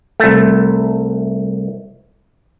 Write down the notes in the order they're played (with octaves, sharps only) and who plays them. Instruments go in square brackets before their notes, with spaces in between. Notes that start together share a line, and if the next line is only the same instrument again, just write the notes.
[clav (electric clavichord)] C2 A3